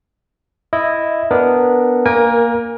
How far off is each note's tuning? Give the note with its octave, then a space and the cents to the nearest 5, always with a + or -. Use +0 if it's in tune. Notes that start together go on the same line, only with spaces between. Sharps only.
E4 +0 D#5 +0
B3 +0 D4 -5 A#4 +0
A#3 +0 A#4 +20 G#5 -30